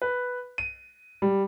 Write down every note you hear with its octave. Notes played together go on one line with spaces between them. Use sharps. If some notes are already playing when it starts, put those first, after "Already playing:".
B4
D#7
G3